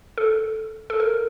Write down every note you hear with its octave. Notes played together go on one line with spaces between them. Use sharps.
A4
A4
A#4